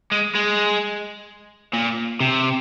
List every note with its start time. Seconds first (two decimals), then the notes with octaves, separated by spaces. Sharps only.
0.12 G#3
0.35 G#3
1.73 A#2
2.20 C3